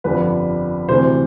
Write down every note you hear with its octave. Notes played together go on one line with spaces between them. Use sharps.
G1 F2 D3 G3 B4
D2 C3 E3 C5